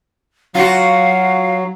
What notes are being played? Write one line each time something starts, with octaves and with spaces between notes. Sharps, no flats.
F#3 F4 F#4 F5